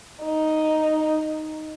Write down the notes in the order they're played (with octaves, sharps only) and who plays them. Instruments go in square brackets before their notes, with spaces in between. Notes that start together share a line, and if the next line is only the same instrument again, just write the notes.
[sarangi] D#4